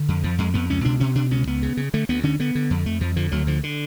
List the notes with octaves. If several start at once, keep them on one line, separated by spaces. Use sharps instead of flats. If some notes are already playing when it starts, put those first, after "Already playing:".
Already playing: D3
F2
F2 F3
F2 G#3
F2 B3
C#2 C#4
B2 D4
B2 C#4
B2 D4
C#2 C#4
C#2 B3
C#3
C#3
D3 A3
D2 B3
D3 C#4
D3 B3
D3
F2
F2 A3
F2 F3
D3 F3
D2 F#3
D3 F3
D3